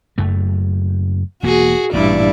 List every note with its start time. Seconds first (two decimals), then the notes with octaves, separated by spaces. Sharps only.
0.18 F#1 F#2 A3
1.43 E1 A#3 F#4 G#4
1.93 A1 G2 A#2 E4 D5